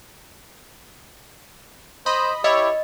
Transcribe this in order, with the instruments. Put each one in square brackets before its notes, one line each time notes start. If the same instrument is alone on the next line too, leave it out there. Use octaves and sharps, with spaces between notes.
[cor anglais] C5 [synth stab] D#5 B5
[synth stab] E4 C#5 [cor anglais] G4 [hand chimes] D#5